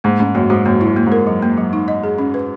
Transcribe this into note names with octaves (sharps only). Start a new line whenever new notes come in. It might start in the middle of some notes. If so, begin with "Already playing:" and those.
G#2 A#3
G#2 C#4
F#2 A#3
G#2 F#4
F#2 A#3
F#2 E4
A#3
G#2
A#4
F#3
A#3
F#3
D#4
D#5
G#4
C#4
B4